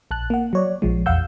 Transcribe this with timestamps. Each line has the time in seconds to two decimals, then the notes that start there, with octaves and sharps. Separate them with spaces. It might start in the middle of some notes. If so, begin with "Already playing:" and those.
0.11 A#1 A5 F#6
0.30 A#3 F#5
0.53 F#3 C#5 D5
0.82 A#1 F3 G#3
1.06 A#1 E2 F5 F#5 E6 G6